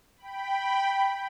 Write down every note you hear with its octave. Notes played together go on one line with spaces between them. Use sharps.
G5 B5